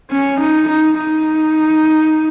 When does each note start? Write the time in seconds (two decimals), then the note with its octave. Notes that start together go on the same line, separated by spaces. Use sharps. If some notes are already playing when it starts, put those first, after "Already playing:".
0.11 C#4
0.41 D#4
0.69 D#4
0.98 D#4